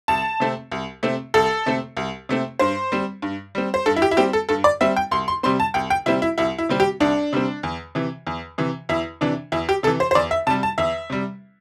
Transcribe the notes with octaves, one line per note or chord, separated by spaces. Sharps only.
C2 A5
C3 A3 C4
C2
C3 A3 C4
C2 A4
C3 A3 C4
C2
C3 A3 C4
G2 C5
G3 C4
G2
G3 C4
C5
G2 A4
E4
G4
E4
G3 C4 G4
A4
G2 A4
D5
G3 C4 E5
G5
C2 C6
C6
C3 G3 C4 C6
A5
C2 G5
G5
C3 G3 C4 E4
E4
C2 E4
E4
C3 G3 C4
G4
C2 D4
C3 G3 C4
E2
C3 E3
E2
C3 E3
E2 E4
C3 E3 D4
E2 E4
G4
C3 E3 A4
C5
C5
E2 D5
E5
C3 G3 A5
A5
E2 E5
C3 G3